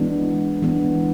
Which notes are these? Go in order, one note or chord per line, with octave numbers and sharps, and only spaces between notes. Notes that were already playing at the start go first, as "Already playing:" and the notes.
Already playing: E3 G#3 B3 D4
E3 G#3 B3 D4